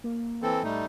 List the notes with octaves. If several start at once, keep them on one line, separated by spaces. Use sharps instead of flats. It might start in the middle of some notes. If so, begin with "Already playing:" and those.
A#3
E3 C4 A4
A2 G3 A3 D#4